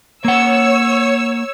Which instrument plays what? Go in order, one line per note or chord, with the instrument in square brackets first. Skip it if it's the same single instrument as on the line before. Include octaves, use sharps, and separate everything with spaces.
[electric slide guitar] A#3 F#5 [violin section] C#5 E6